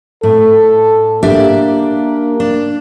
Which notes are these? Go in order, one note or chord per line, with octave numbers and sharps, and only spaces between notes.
A2 A4
A#3 D4 G4 E5
D4